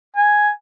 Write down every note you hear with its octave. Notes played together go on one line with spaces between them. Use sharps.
G#5